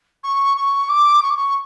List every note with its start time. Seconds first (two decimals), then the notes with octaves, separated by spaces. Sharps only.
0.24 C#6
0.57 C#6
0.89 D6
1.22 C#6
1.30 D6
1.37 C#6